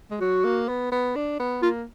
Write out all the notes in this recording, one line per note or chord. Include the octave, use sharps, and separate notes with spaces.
G#3
F#3 F#4
A#3
B3
B3
D4
B3
A#3 F4